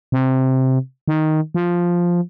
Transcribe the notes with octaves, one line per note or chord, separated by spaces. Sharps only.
C3
D#3
F3